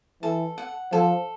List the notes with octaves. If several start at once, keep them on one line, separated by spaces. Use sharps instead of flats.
E3 A4
F#5
F3 A4